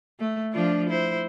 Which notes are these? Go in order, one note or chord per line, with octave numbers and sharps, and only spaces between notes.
A3
F3 D4 F4
E4 C5